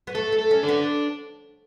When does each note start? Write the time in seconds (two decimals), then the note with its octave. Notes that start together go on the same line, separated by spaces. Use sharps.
0.07 B3
0.15 A3 A4
0.32 A3
0.39 A4
0.51 C#4
0.63 D4
0.68 B3